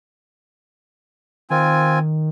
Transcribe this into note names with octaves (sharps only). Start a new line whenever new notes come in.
D#3 C4 F4 G#5